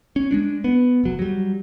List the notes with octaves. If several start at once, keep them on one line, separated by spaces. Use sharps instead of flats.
C#4
G#3 A3 D4
B3
F1 F#3
F#3 G3